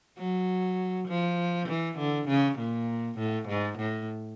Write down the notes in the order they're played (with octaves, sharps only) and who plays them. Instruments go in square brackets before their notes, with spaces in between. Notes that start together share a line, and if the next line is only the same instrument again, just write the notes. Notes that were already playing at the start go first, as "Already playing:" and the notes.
[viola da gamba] F#3
F3
E3
D3
C#3
A#2
A2
G#2
A2